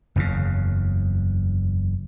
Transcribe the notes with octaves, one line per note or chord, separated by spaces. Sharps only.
F#1 E2 A2 C#3